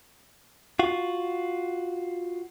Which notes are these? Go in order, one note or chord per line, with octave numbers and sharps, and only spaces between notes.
F4 F#4